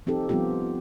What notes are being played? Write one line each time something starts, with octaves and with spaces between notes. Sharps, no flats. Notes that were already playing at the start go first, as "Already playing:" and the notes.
F3 C4 D#4 G4 A4
F3 G3 B3 C4 F4 G4